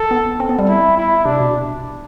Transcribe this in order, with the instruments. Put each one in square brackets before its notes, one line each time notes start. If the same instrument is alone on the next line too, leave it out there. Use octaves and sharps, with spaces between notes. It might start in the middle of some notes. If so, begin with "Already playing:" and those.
Already playing: [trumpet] A4
[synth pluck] B3
C4
B3
G3
[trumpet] E4
E4
[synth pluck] C3 [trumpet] D4
[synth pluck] B2